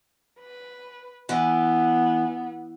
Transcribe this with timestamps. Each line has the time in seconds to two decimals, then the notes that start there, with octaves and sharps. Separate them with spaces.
0.39 B4
1.29 E3 B3